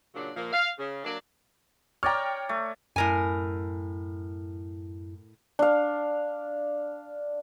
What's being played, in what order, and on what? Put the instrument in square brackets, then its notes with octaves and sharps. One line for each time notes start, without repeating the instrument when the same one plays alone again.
[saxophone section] A#2 C#3 F#3 D4
A#2 F3 A#3
F5
C#3
F#3 A#3 D4
[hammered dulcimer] C#5 D5 A#5 [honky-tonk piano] G5 F6
[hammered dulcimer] A3
[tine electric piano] F#2 E4 [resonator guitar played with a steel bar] A2 A#4 G#5
[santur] D4 F5